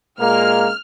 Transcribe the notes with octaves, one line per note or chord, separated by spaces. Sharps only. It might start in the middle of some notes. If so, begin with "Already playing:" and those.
A#2 G#3 A#3 F6